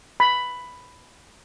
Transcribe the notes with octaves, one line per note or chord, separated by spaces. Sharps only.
B5